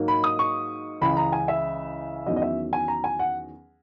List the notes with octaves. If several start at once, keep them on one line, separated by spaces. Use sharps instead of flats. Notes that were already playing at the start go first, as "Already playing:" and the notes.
Already playing: G#2 F#3 A#3 D#4
B5
D#6
C#6
C#2 C#3 E3 B5
A#5
G#5
E5
E2 D#3 F#3 C#4 D#5
D#5
E5
G#5
A#5
G#5
F#5